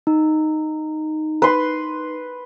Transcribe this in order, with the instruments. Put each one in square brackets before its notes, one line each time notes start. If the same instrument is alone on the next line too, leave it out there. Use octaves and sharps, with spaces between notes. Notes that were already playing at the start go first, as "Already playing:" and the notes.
[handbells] D#4
[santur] B4 C6